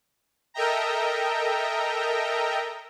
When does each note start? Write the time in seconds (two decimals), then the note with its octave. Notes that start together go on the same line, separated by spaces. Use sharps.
0.54 A4 A#4 D#5 E5 G5 A#5